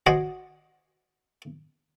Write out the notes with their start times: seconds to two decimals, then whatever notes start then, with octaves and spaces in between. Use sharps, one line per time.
0.06 F#4 C5 D5 D#5 F#5 G#5